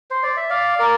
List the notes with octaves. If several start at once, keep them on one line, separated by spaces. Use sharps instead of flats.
C5
D5
E5
D5 F5
A#4 D5